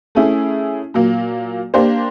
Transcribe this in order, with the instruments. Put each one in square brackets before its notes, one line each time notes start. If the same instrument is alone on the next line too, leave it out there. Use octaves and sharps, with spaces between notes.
[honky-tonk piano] A3 C#4 E4 G#4
A#2 F#3 A#3
A#3 D4 G4 C5